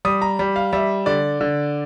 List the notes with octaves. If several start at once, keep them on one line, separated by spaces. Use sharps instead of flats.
G3 D#6
A#5
G3
F5
G3 E5
D3 D5
D3